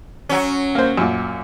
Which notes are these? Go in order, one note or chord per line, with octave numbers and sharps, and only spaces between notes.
F#3 C#4
A#3 C5
F#2 A#2